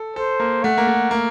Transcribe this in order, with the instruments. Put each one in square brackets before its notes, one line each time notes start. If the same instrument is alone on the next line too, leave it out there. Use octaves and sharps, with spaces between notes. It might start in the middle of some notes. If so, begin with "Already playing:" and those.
Already playing: [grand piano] A4
[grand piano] A4 [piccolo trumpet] C5
[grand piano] A#3
[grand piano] A3 [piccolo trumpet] F#5
[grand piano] A#3
A3
A#3